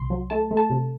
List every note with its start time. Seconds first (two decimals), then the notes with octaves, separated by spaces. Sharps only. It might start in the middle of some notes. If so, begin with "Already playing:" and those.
Already playing: C2 C6
0.10 F#3
0.30 A3 A5
0.51 A3
0.57 A5
0.70 C3